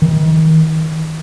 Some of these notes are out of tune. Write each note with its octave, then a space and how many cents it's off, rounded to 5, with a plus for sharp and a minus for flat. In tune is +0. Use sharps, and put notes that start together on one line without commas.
D#3 +35